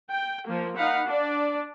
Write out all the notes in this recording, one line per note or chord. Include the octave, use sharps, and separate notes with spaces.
G5
F3 A#3
D#4 F5 F#5 B5
D4 D5